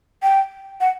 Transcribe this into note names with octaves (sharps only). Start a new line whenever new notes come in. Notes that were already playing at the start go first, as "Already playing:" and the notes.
G5
F#5